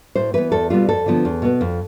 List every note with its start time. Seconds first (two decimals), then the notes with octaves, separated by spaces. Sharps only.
0.15 A2 C5
0.34 E3 B3 B4
0.52 E2 A4
0.70 B2 G3 B3 F4
0.89 F2 A4
1.06 D3 F3 B3
1.25 E2
1.42 B2 B3
1.61 F2